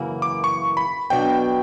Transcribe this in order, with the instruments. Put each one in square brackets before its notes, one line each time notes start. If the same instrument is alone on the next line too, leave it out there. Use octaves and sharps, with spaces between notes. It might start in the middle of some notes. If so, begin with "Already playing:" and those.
Already playing: [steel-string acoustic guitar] F#2 C#3 E3 A#3 E4
[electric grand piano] D6
C#6
B5
[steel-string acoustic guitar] B2 F#3 B3 D4 F#4 [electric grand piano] G5